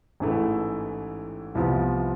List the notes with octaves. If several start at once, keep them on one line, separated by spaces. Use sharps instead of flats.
A1 G#2 E3 A3 E4
C2 C3 F3 B3